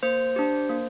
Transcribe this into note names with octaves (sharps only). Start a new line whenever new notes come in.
A#3 C5
D4 G4
A#3